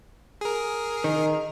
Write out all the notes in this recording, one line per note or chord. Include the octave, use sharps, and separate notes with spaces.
G#4 A#4
D#3